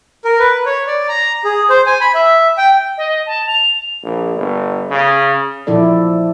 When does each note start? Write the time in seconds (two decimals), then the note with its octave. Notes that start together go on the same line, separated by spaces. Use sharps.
0.25 A#4
0.39 B4
0.66 C#5
0.87 D5
1.09 A#5
1.45 G#4
1.70 C5
1.86 G#5
2.01 B5
2.15 E5
2.57 G5
2.98 D#5
3.26 A5
3.47 F7
4.03 A#1
4.36 G1
4.91 C#3
5.67 A#2 F3 E4 A4 D5